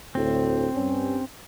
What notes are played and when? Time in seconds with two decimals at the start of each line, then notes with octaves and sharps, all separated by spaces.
0.15 D2 A2 C4
0.74 G2 C#4